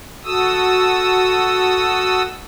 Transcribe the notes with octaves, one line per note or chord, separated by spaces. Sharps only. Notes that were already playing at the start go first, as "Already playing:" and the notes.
F#4 A4 D#6 E6